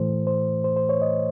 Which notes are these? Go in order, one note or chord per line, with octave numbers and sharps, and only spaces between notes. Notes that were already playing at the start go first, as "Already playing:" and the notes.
Already playing: A2 E3 A3 C5
C5
C5
C5
C#5
D#5